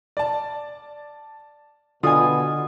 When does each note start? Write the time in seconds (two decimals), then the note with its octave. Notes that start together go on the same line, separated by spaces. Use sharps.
0.17 D5 A5
2.03 B2 D3 F4 G#5 D#6